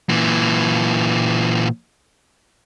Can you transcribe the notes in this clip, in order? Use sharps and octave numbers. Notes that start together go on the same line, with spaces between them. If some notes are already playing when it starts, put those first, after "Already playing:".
A#2 E3